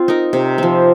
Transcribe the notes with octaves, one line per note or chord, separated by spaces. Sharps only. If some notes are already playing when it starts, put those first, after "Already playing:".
Already playing: C4 F4
D#4 A#4
C3
F3 C4